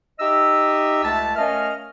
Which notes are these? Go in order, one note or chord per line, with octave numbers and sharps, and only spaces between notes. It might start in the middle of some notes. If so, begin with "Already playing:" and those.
D#4 G4 D#5 E5 E6
C#2 A3 E5 A5
A3 C#4 A#4 D#5 F5 F6